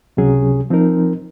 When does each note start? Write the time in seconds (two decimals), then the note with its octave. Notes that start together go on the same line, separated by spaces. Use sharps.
0.17 C#2 C3 F#3 C#4 G#4
0.70 F3 C4 D#4 A#4